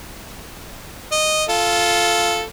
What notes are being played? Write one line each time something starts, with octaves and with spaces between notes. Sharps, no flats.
D#5
F4 A4